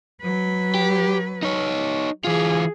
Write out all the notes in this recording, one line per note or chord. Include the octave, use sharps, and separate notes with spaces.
F#3 B4
G4
D#4 C#5
E3 F4 G#4